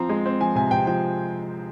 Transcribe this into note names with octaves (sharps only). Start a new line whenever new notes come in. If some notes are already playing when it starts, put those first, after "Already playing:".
Already playing: F3 C4 A#5
G#3
C4
F3 G#5
C3 G#5
C3 G5
F3 G5